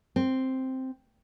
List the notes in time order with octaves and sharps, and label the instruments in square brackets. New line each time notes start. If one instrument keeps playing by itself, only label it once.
[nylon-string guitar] C4